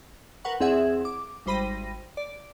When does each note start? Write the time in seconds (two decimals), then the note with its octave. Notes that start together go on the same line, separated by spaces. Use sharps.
0.45 A#4 B4 F#5 C#6
0.60 E2 C4 G#4 E5 F#5 G#6
1.05 D6
1.46 G#1 G3 C5 B5 A#6 D#7
2.17 D5